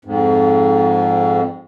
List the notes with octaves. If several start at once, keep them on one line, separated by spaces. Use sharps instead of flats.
F2 G#2